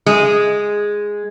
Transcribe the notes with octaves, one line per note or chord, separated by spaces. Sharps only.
G#3